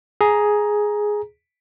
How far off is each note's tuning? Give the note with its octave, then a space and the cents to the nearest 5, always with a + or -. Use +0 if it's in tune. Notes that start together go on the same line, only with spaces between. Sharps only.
G#4 +5 A#5 +10